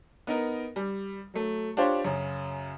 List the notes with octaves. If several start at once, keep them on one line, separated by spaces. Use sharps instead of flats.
B3 D#4 A#4
G3
F#3 A3
D4 F4 G4 C5 C#5
F#2 C#3